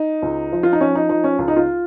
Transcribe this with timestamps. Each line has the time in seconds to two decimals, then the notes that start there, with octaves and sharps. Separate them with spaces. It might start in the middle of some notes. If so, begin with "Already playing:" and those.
Already playing: D#4
0.22 C#2
0.52 F3
0.63 F4
0.73 D#4
0.81 F3 C#4
0.95 D#4
1.09 F3 D#4
1.24 C#4
1.39 C#2 F4
1.48 D#4
1.56 F4